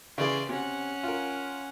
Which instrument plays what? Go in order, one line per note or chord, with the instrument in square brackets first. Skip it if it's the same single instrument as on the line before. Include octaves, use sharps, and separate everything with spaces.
[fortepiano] C#3 E3 G#4 [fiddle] D5 C6
[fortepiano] C3 [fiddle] C#4 F#5
[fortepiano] F4 A#4